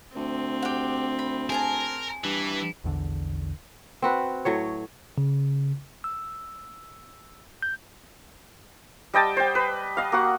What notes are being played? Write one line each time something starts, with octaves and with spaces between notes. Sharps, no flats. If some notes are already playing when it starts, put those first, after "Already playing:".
D2 C4
G4 F#5
B5
G#4 A#4 G#5 A5
G2 E3
A#1 E2 D3
C4 F#4 B4
A2 F#3 C#5
C#3
E6
G6
G3 D#5 G5 A5
C5 G5
B4
D#5 F5
A#3 F#4 F#5